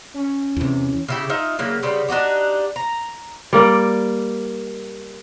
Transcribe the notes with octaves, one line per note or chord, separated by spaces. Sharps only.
C#4
E2 C3 E3
C#3 E4 G4
D#4 F4 E5
C#3 F#3 A#3
C#3 G3 B3 C4
D4 D#4 F#4 G4
A#5
G3 A#3 D5